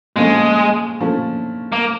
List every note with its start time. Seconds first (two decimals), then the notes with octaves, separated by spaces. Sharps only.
0.16 A#2 F3 G#3 A3 C#4
1.00 A#2 F3 A3 C#4
1.72 A#3